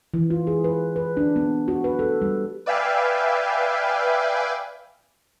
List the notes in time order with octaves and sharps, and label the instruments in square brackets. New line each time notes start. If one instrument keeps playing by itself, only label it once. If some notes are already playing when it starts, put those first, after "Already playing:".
[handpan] E3
F4
G#4
B4
B4
D4
B3
F#4
B4
A4
G3
[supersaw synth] B4 D5 E5 F5 G5 G#5